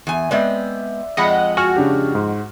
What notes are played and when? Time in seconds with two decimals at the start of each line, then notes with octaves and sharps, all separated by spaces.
0.07 E2 G#5
0.31 G#3 B3 C4 D5 E5
1.17 F2 G#3 D#5 F#5 B5
1.57 F#4 G#5 F6
1.76 C#3 D4 G4
2.15 G#2 C6